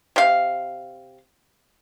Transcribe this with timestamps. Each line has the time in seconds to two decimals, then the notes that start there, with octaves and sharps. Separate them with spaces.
0.16 C3 F5